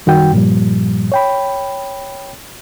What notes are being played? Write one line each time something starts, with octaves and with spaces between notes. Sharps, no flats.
F#2 D#3 G3 F#4 G5
G2 A#2 F3 G3
C#5 G5 B5